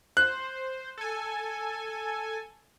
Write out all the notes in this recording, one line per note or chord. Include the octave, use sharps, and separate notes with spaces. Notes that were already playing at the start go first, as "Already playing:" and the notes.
C5 F#6
A4 G#5